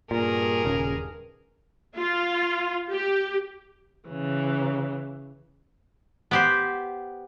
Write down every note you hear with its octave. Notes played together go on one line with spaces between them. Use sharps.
G2 A#2 G#4 A#4
D#1 C#3
F4
G4
C#3 E3
B3 G4 C5